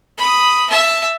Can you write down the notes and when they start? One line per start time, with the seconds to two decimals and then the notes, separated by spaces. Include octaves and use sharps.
0.18 B5 D#6
0.70 E5 A5